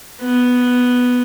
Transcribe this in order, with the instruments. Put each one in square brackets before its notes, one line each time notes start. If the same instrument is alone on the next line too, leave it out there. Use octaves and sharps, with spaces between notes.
[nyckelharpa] B3